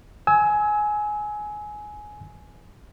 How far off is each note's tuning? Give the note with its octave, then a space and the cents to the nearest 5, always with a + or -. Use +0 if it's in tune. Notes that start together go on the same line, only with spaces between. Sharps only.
G#5 +15 E6 -30